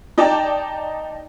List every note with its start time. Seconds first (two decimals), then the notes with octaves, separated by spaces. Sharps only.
0.18 D#4 D5 G5 A5